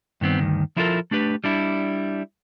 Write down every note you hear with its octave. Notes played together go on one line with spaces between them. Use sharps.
G2 D#3 B3 C4
D2 G2 D#3
F3 E4 F4 G4 A4 A#4
A3 D4 G4 B4
G3 D4 E4